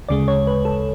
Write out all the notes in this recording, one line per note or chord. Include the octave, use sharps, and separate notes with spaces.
D2 C#3 G#3 D5
C#5
B4
A4